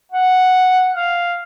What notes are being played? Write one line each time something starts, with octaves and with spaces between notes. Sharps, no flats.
F#5
F5